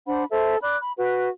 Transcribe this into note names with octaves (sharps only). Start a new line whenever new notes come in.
D4 C5 F#5 B5
A4 C5 E5
D5 B5 D6 F#6
B5
F#4 B4